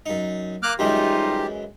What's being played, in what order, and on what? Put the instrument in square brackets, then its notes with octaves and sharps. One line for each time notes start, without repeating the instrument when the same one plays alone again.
[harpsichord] F#2 D#4
[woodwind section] A#3 [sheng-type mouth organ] D6 F6 F#6
[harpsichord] F#2 E3 G#3 [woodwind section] G3 D#4 F4 [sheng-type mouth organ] G4